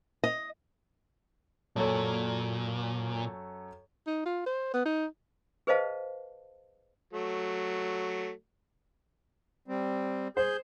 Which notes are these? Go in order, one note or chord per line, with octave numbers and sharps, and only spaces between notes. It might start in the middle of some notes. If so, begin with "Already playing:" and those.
D#5
F#2 A#2 A4 C#5
D#4
F4
C5
B3
D#4
G#4 B4 C5 D#5 F5 A5
F#3 A3
G3 C4
G#4 C5 G6